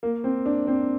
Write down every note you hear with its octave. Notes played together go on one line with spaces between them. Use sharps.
A#3
C4
D4
C4